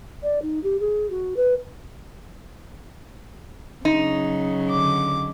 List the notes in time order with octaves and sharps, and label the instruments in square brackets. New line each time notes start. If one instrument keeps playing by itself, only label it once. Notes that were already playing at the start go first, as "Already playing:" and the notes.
[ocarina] D5
D#4
G4
G#4
F#4
B4
[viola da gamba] C#3 F#3 [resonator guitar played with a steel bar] D#4
[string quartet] D3 D6